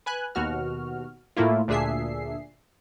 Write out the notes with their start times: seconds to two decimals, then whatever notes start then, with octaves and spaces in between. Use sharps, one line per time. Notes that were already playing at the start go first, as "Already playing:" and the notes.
0.06 B4 G#5 F#6
0.35 D#2 B2 F#4 F6
1.37 A2 A3 A#3 E4 F4
1.68 D2 A#2 D4 G#4 E5 C7